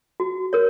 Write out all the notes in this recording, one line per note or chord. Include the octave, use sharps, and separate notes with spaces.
F#4
A#4 C#5